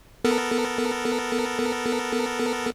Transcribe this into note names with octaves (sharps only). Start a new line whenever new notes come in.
B3 A4 A#4